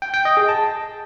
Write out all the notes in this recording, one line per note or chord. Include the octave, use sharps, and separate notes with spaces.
G5
G5
D#5
G#4
A5